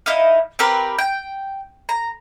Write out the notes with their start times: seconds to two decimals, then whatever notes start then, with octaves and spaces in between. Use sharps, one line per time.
0.06 D#4 E4 D#5 F5
0.59 C4 G4 A#4 B4
0.99 G5
1.89 A#5